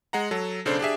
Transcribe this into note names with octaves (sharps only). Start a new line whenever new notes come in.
G#3 F#5 A#5
F#3 A4
B1 C#3 D4 A4 C5
D4 G4 G#4 E5